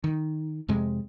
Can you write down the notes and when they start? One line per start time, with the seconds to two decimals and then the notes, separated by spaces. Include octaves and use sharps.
0.04 D#3
0.68 F2 C3 G#3